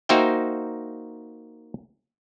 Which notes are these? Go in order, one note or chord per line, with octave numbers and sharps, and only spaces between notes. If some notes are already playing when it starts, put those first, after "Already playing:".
A#3 D#4 F#4 C5 E5 G5